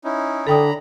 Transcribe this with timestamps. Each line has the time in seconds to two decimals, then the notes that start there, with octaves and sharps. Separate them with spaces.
0.04 C#4 D#4 E4
0.47 D3 A4 G5 A#5 B5 D#6